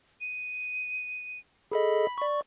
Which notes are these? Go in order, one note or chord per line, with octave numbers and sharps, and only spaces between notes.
D#7
G#4 A4 D#5 B5
D5 C#6